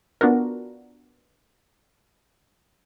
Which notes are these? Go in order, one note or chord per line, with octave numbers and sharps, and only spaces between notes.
B3 D4 F4 F#4 A#4